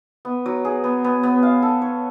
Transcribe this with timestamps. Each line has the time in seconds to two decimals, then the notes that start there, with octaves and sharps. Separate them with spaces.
0.25 B3
0.46 F#3
0.65 G#4
0.84 B3
1.04 B3
1.23 B3
1.43 F5
1.62 A4
1.82 C#5